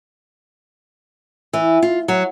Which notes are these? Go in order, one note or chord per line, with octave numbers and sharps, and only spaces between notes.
E3
F4
F#3